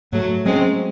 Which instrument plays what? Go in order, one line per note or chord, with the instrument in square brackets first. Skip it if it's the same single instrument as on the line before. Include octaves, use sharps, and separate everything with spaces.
[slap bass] G#2 [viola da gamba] F#3 A3
[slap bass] F#3 C#4 [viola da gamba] G#3 C4